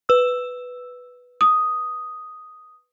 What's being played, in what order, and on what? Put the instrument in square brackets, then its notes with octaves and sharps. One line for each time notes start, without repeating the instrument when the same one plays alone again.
[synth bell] B4 E6
[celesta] D#6